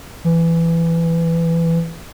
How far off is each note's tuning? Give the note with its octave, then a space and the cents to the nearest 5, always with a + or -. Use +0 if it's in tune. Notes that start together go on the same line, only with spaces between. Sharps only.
E3 +15